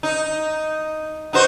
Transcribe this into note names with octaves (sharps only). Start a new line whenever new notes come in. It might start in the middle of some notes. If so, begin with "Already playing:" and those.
D#4
D#4 F#4 C5